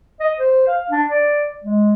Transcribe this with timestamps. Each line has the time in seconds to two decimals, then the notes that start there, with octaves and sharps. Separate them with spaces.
0.20 D#5
0.39 C5
0.67 F5
0.90 D4
1.09 D5
1.64 G#3